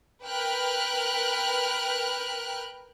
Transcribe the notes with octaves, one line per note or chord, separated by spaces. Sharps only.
A#4 B4 G5 F6 F#6